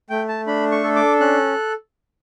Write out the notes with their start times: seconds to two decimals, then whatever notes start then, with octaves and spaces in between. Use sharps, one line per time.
0.10 A3 G5
0.28 A5
0.47 D4 B5
0.72 C#6
0.84 A4
0.96 D6
1.20 C#4 F#6